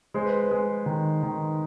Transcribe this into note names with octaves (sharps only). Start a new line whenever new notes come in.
G#3 C5
B4
B4
G#3
D#3
D#3